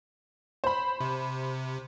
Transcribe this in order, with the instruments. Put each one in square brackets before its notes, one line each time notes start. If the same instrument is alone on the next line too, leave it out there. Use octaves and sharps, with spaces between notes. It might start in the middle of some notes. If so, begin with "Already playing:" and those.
[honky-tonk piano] C5 B5
[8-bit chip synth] C3